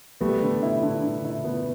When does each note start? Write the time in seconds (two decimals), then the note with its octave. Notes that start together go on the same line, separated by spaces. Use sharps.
0.21 G3 A3 B3
0.42 D3
0.63 E4
0.83 D3
1.03 D3
1.25 E4
1.44 B3